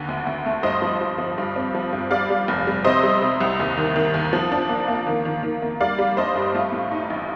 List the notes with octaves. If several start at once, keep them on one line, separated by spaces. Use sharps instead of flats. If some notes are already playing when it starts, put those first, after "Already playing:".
Already playing: D#2 D3
D2
D2
A3
G2 C5 D#5
F3
F3
F3
G2
C4
F3
G2
G3 D5 F5
G3
F1
G3
C3 C5 D#5
G3
C3
C2
D#2
D#3
D#3
D#2
F3
D4
A#3
A#3
D#3
D#3
D#3
A#3
G3 D5 F5
G3
D4 C5 D#5
G2
A3 F4
A2
D#4
A1